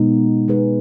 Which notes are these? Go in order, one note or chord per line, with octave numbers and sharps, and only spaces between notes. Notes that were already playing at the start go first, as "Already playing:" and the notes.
Already playing: B2 G#3 B3 D#4
G#3 D#4 G#4 B4